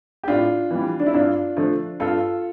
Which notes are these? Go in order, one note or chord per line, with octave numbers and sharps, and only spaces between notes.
G4
A2 D4 F4
E3 G3
D4
E4
G2 D4 F4
D3 F3 A3
G2 F4 A4